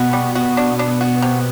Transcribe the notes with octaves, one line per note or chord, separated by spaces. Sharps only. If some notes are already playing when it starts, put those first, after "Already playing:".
Already playing: B2 B3 F#4
G3
F#4
B2 B3 D4
D4
F#4
C3